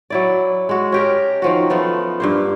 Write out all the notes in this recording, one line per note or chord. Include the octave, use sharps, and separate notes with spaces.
F#3 E4 D5
G#3 F#4
C#4 G4 A#4
D#3 F3 F#4
F3 A3 B3
G2 A#3 C5